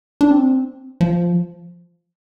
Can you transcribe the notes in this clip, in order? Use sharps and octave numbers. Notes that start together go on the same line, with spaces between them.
D4
C4
F3